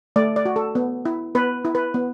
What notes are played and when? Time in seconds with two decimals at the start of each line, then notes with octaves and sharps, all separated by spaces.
0.16 A3 D5
0.36 D5
0.45 F#4
0.56 A4
0.75 B3
1.05 E4
1.35 B3 B4
1.65 E4
1.75 B4
1.94 B3